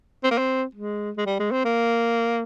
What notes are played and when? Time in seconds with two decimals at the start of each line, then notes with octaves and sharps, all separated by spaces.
0.24 C4
0.31 A#3
0.38 C4
0.75 G#3
1.17 G#3
1.26 G3
1.39 G#3
1.52 C4
1.65 A#3